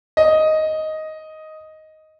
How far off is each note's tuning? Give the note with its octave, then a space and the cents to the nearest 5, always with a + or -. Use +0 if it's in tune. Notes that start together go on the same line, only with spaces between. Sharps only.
D#5 +5